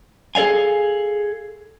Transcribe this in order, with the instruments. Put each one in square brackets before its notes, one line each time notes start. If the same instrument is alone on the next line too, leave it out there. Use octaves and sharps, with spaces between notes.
[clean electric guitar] G#4 A4 D5 F5 G#5